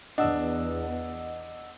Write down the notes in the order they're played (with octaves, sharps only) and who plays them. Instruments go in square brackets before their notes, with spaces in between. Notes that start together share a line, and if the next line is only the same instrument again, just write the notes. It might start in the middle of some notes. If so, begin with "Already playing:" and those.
[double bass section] E2 [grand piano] D4 [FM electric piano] D#5 F#5 E6